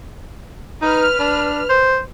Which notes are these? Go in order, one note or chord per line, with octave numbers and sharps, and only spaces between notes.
D#4 B4 F6
D4
C5